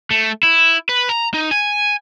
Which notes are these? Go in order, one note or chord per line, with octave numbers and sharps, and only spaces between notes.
A3
E4
B4
A#5
D#4
G#5